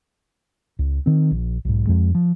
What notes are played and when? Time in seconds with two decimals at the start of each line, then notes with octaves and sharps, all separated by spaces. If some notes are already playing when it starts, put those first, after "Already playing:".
0.79 C#2
1.06 D#3 C4
1.31 A#1
1.65 B1 G#2
1.87 F2 G#3
2.15 F3